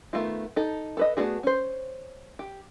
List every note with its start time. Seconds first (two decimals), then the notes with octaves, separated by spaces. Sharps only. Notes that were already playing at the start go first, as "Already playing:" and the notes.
0.13 D#3 A3 B3 F4
0.56 D#4 A4
0.97 A4 B4 D#5
1.17 A3 B3 D4 F#4 G#4
1.43 C#4 C5
2.39 G4